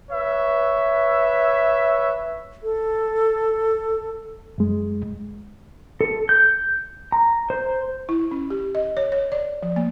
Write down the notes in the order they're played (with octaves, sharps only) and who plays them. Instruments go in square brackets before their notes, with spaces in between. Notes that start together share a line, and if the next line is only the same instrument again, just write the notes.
[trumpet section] B4 C#5 E5
[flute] A4
[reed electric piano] F#2 G#3
[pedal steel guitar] A4
G6
A#5
C5
[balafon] E4
C#4
G4
D#5
C#5
C#5
D5
F3
A#3